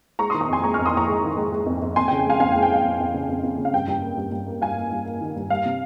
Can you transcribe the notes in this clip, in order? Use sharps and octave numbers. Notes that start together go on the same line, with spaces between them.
G#3 A#5 C#6
D#3 C6 D#6
A#5 C#6
F2 G#5 C6
G#3 A#5 C#6
F2 C#6 F6
C6 D#6
F2 A#5 C#6
G#3
D#3
G#3
G#3
F2
F2
F2 G#5 C6
G5
C#3
G5
G#3 F5 G#5
F2 F5 G#5
G5
G#3
G5
G#3 F5
F2
F2
C#3
F2
F2
C#3
F5
G2 G5
G2
A#3
G2
G2
A#3
G2 F5 G#5
A#3
G2
A#3
D#3
G2
G3 F5
C3